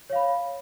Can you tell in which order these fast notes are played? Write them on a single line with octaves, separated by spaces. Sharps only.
C#5 F5 B5